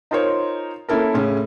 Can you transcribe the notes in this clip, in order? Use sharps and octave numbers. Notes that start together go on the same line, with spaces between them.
D#4 F4 A#4 C5 C#5
A#3 C#4 E4 A4 A#4
A2 C#3 C#4